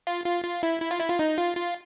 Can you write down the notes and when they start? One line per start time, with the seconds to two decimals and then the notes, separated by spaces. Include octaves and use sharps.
0.07 F4
0.25 F4
0.44 F4
0.63 E4
0.81 E4
0.91 F4
1.00 E4
1.10 F4
1.19 D#4
1.38 F4
1.57 F4